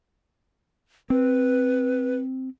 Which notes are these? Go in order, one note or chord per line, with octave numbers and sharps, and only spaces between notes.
C4 B4